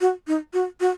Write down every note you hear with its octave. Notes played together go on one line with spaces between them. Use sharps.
F#4
D#4
F#4
F#4